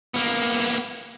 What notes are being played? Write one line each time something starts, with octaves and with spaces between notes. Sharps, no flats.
A#3 B3